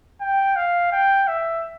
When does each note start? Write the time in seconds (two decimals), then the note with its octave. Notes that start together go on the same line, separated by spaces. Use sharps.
0.21 G5
0.56 F5
0.92 G5
1.27 E5